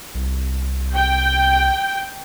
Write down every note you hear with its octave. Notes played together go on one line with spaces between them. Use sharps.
C2
G5